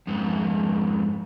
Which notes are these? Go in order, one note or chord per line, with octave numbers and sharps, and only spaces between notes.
F2 G#2